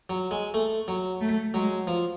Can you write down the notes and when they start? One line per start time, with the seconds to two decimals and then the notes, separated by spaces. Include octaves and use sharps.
0.10 F#3
0.31 G#3
0.54 A3
0.88 F#3
1.21 A3
1.54 F#3 G#3
1.87 F3